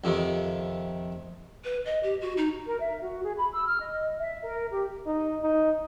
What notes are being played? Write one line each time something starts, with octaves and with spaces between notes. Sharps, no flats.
F2 C3 D#3
B4
D#5
G4
F#4
D#4
A#4
E5
F#4
G#4
B5
E6
F6
D#5
E5
A#4
G4
D#4
D#4